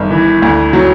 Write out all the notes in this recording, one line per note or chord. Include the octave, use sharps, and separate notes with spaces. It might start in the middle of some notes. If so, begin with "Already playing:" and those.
Already playing: G1 D#3
E3
D2
F#3